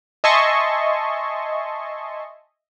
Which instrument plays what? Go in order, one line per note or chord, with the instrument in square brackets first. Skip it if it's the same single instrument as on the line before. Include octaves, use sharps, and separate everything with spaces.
[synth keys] D#5 E5 G#5 A5 C6 C#6